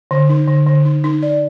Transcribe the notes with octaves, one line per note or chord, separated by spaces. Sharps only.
D3
D#4
D3
D3
D#4
D#4
D5